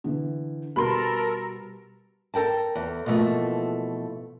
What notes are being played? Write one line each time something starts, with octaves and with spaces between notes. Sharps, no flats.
D3 E3
B2 G3 A4 A#4 B5 C6
A4 A#4 G5 A5
E2
B2 E3 F3 A3 A#3